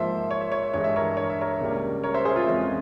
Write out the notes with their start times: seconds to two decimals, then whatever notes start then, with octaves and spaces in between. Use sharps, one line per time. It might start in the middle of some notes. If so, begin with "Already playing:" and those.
Already playing: G#2 F3 A#3 C5 E5
0.31 C#5
0.41 E5
0.52 C#5
0.64 E5
0.74 G2 E3 G#3 C#5
0.84 E5
0.96 A#4 C#5
1.17 C#5
1.30 E5
1.41 A#4 C#5
1.61 C#2 C#3 G3 A#3
2.04 A#4 C#5
2.14 C5 E5
2.25 G#4 C5
2.36 F4
2.46 F2 E3 G#3 C#4